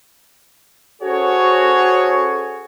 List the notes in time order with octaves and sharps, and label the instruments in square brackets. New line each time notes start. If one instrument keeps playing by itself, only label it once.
[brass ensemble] C#4 F#4 G#4 A4 C5 C#5